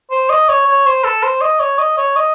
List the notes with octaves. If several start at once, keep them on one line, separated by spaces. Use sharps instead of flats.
C5
D#5
C#5
C#5
C5
A4
C5
D#5
C#5
D#5
C#5
D#5